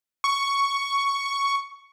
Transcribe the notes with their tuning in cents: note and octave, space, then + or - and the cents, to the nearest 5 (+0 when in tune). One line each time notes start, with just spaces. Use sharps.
C#6 +5